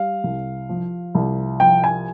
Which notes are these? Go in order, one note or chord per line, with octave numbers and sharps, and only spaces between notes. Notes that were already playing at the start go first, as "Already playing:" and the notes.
Already playing: G3 F5
C2
F3
C2
F3 G5
G#5